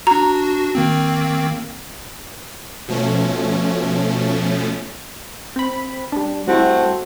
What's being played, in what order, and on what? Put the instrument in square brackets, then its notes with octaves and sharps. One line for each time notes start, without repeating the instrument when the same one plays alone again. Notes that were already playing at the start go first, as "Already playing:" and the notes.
[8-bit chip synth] D4 F#4 [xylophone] A#5
[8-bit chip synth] D#3 A#3 C4
[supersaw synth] B2 F3 A3 C#4
[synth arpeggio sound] C4 B5
G3 D4
[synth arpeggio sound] G3 E4 [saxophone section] A3 C4 F#4